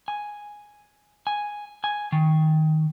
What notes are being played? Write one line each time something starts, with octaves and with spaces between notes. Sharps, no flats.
G#5
G#5
G#5
D#3